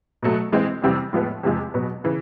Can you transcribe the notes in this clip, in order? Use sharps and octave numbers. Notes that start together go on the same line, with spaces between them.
B2 F#3 A3
E3 G#3 C4
F2 C3 E3 G3 C4
A2 F3 G#3 B3
E2 C3 F3 G#3
B2 F#3 B3
C#3 E3